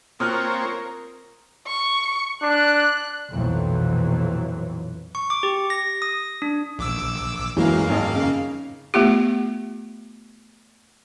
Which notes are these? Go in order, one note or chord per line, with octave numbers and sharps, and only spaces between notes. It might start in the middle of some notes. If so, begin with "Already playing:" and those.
A#3 C4 F4 A#4 C#5 D#6 F6 F#6
C#6
D4 F#6
B1 F2 A#2 E3 F#3
C#6
D6
G4
A#6
D#6
D4
A#1 D6 E6
F#2 E3 F#3 G#3 A#3 F5
G#1 D#5
C#3
A3 B3 F4 G4